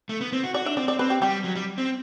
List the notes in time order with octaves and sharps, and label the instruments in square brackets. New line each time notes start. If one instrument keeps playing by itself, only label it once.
[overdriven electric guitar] A3
B3
C4
F#4
[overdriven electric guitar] F#4 [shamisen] D5
[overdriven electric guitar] D4 [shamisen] E5
[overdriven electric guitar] C4 [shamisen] D5
[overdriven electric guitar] C4 [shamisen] D5
[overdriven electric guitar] C4 [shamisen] B4
[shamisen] G4
[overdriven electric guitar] G3 [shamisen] G4
[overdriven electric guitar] F#3
G3
C4